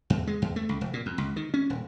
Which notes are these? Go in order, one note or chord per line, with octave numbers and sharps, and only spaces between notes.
E2
G#3
E2
A3
C#2
F1
A#2
F2
C#2
D#3
C#4
D#1